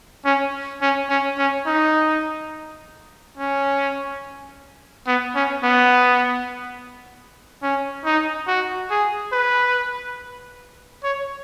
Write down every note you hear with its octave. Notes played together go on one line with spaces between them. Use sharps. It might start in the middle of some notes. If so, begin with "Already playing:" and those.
C#4
C#4
C#4
C#4
D#4
C#4
B3
C#4
B3
C#4
D#4
F#4
G#4
B4
C#5